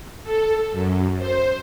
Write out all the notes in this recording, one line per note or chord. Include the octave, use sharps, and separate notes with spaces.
A4
F#2
C5